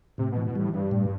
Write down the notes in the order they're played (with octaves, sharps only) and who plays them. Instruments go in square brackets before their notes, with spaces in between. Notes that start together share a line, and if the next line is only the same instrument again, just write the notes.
[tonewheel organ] A2 [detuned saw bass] C3
[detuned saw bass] B2
[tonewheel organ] E3
[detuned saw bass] B2
[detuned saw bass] A2 [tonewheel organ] G3
[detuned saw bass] G2 [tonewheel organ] G3
[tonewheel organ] A2